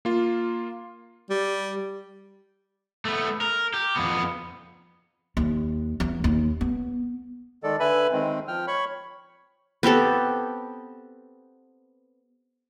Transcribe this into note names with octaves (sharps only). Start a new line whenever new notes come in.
A#3 F4
G3
A3 B3
A#4
G4
F2 B3
D#2
E2
D#2
B3
D#3 G#3 A4 D5
D3 B4 E5 G#5 B5
D#3 G#3 C4
F3 G5 F6
C#5 B5 C#6
B3 C4 G4 A4